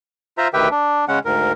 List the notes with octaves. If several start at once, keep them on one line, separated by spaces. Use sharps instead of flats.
F4 C5 E5 A#5
D2 D#3 G4 B4 E5 G5
D4
C#3 G#3 C#4 F#5
D2 G#2 A#4